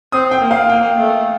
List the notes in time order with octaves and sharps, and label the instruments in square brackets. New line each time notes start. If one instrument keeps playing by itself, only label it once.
[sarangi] C4 [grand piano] D#6
[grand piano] G5
[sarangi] A#3
[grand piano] F5
[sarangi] A#3 [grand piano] G5
[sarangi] A3